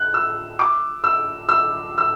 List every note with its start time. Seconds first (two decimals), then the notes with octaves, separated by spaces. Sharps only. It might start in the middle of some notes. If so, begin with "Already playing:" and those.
Already playing: F#6
0.14 E6
0.59 D6
1.04 E6
1.49 E6
1.98 E6